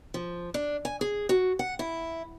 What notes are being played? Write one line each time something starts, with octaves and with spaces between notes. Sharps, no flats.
F3
D4
G#5
G#4
F#4
F#5
E4